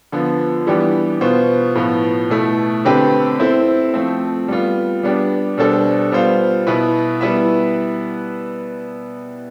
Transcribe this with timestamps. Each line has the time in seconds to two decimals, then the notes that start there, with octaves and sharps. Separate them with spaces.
0.12 D3 F3 B3
0.67 E3 G3 B3 D4 G4
1.21 B2 B3 F4 C5
1.75 A2 F3 B3
2.30 B2 A3 E4
2.85 D3 A3 C4 G4 B4
3.40 C4 E4 A4 C5
3.94 F3 A3 C4
4.48 G3 B3 F4
5.03 G3 B3 D4 G4
5.58 B2 G3 D4 A4 C5
6.12 G3 B3 F4 C5 F5
6.67 B2 B3 E4 B4
7.21 G3 B3 E4 B4 E5